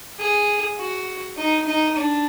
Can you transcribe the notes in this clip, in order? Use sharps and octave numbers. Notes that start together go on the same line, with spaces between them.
G#4
F#4
D#4
D#4
D4